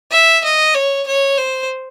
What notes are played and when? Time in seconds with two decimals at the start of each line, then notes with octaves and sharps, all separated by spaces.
0.11 E5
0.44 D#5
0.75 C#5
1.06 C#5
1.38 C5